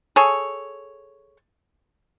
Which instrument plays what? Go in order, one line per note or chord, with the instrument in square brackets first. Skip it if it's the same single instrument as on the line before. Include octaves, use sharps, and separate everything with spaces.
[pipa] G#4 A4 C#5